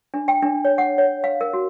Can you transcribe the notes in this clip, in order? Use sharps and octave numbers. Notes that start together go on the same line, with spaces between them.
D4
G5
D4
C#5
F#5
C#5
F5
A#4
F#4